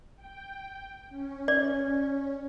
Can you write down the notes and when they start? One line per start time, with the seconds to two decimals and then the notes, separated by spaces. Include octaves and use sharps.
0.16 G5
1.09 C#4
1.48 D5